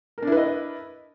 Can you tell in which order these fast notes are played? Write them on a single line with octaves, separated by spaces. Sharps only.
A#4 D4 E4 B4 D#5